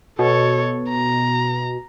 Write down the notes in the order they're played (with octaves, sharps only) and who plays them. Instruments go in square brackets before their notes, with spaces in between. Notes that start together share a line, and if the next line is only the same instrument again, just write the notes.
[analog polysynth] B2 [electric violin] A4 C#5
[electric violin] A#5